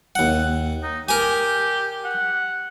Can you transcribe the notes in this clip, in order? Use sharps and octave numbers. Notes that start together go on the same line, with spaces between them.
D#2 F#5
D#4
G4 A#4 G#5
F#5